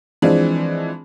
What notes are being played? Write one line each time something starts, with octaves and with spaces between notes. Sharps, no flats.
E3 F3 G#3 C4 D4